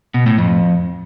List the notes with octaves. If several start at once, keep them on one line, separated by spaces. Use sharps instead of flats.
B2
A2
F2